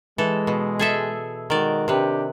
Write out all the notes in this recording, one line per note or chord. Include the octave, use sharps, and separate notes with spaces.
E3 G#3 A4
B2
G#4 A4 E5
D#3 G#3 D#4 F#4 D5
C3 D4 G4 B4